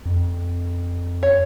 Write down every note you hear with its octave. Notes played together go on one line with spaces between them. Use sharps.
F2
C#5